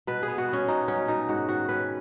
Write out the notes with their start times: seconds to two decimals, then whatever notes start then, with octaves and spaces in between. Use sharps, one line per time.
0.07 B2 B4
0.23 G#4
0.28 B3
0.38 F#4
0.48 B3 C#4
0.68 B2 D#4
0.88 F#3 C#4
1.08 B2 D#4
1.29 G#2 F#4
1.49 D#3 F#4
1.69 C#4 B4